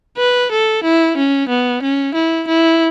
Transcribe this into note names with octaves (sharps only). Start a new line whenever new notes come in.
B4
A4
E4
C#4
B3
C#4
E4
E4